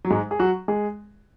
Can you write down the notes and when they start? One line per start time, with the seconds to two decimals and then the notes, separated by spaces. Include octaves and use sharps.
0.05 F#3
0.11 G#2 G#3
0.31 G#4
0.39 F#3 F#4
0.68 G#3 G#4